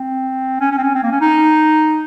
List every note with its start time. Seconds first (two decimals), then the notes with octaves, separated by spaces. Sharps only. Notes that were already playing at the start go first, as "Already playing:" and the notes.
Already playing: C4
0.60 C#4
0.71 C#4
0.78 C4
0.83 C#4
0.95 C4
1.03 A#3
1.12 C#4
1.21 D#4